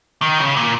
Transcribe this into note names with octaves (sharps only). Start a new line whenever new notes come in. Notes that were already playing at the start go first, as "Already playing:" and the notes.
D#3
C#3
A#2